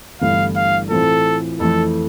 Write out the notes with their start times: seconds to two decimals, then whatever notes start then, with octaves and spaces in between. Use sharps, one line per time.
0.21 G1 G2 E3 A3 E4 F5
0.56 F5
0.90 A2 E3 A3 C4 F4 A4
1.60 F2 E3 A3 A4